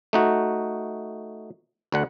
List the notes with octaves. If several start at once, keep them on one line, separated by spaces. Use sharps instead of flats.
A3 D#4 F#4
D2 D3 F#5